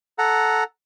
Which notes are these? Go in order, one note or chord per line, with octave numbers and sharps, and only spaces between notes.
A4 F#5 A#5